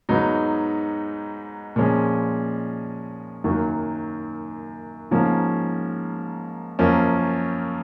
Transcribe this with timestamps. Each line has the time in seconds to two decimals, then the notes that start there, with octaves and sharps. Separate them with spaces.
0.09 G#2 F#3 B3 D#4
1.76 A#2 F3 G#3 C#4
3.44 F#2 D#3 F#3 A#3
5.11 G#2 F3 A#3 C#4
6.79 F#2 F3 A#3 C#4